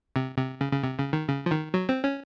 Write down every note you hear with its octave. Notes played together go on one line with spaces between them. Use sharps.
C3
C3
C#3
C#3
C3
C#3
D#3
C#3
F3
D#3
F#3
C4
C#4